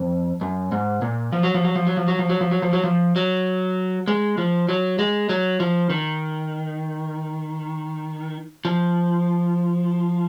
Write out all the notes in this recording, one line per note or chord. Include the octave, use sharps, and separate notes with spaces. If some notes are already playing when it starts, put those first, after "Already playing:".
Already playing: F2
F#2
G#2
A#2
F3
F#3
F3
F#3
F3
F#3
F3
F#3
F3
F#3
F3
F#3
F3
F#3
F3
F#3
G#3
F3
F#3
G#3
F#3
F3
D#3
F3